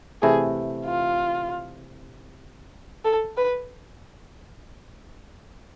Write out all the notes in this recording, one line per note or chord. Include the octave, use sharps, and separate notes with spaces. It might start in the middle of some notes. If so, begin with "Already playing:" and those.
C3 E3 A3 E4 G#4
F4
A4
B4